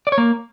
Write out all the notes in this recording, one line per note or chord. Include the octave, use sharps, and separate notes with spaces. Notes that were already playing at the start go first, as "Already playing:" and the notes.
D5
C#5
A#3